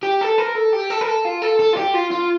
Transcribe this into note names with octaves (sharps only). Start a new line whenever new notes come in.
G4
A4
A#4
A4
G4
A4
A#4
A4
F4
A4
A4
F4
G4
F4
F4